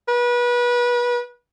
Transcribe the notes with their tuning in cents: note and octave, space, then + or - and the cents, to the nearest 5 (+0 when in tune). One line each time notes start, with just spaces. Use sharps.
B4 -30